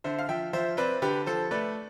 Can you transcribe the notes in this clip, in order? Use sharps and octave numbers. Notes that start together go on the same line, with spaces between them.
D3 C5 E5
F5
F3 E5 G5
F3 C5 E5
C4 B4 D5
D3 G4 B4
F3 A4 C5
A3 B4 D5